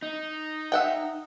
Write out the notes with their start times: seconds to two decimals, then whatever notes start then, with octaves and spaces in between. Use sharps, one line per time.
0.02 D#4
0.72 E5 F#5 G5